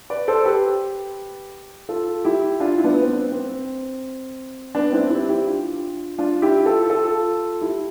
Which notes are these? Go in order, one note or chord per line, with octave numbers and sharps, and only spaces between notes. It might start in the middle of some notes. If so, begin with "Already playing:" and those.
B4 D5
A4 C5
G4 B4
F4 A4
E4 G4
D4 F4
E4
B3 D4
C4
B3
C4
B3 D4
C4 E4
E4 G4
E4 G4
D4 F4
D4 F4
E4 G4
F4 A4
F4 A4
E4 G4